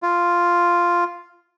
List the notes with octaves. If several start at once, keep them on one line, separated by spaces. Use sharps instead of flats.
F4